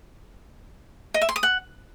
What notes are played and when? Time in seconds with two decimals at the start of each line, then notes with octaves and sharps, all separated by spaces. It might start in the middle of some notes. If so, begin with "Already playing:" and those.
1.14 D#5
1.22 E5
1.29 C6
1.36 D#6
1.43 F#5